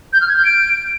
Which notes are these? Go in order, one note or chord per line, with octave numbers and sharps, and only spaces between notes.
G6
F6
G#6
G6
D7